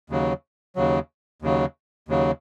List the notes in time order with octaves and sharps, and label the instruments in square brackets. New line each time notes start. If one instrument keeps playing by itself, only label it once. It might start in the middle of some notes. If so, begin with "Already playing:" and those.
[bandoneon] D#2 C#3 F#3
D#2 C#3 F#3
D#2 C#3 F#3
D#2 C#3 F#3